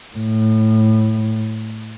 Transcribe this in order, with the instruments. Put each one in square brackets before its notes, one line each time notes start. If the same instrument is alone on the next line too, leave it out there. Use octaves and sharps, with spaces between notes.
[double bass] A2